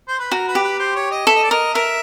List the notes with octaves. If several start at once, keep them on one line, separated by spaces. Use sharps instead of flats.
C5
B4
F#4 A#4
B4
G4
B4
C5
C#5
D#5
A4 E5
D#5
D5
A#4 D#5
A#4 E5